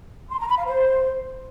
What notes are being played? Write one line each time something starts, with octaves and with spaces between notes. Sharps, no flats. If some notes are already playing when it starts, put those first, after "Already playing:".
C6
A#5
B5
F5
C5